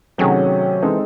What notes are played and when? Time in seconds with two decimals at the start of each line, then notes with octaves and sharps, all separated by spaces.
0.18 C3 D#3 F#3 A3 C#4 G#4
0.82 E3 G#3 C4 D#4 A4